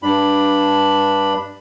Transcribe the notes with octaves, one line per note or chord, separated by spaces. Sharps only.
G2 D4 B5